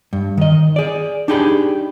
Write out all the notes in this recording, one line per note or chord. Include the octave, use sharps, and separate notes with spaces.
G2
D#3 D#5
G#4 D5
D4 D#4 G4 G#4 A#5 B5